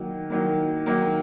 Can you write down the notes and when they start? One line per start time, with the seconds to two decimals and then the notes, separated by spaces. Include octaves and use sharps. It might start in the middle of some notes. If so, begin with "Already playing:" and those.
Already playing: D#3 F#3 A#3
0.30 D#3 F#3 A#3
0.86 D#3 F#3 A#3